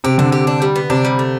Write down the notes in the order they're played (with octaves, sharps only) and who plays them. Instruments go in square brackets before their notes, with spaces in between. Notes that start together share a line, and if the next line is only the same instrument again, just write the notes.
[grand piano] C3 [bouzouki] G4
[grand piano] D3 [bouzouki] D4
[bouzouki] G4
D4
G3
B3
[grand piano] C3 [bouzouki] D4
[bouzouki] G3
A3